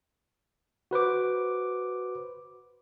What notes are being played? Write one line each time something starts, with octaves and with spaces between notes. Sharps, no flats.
F#4 B4 C5 D6